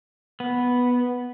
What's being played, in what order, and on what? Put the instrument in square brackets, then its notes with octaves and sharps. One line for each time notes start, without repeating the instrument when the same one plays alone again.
[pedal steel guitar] B3